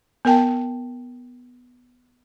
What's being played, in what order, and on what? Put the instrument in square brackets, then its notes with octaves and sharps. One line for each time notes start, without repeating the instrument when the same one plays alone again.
[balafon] B3 A#4 G5 A5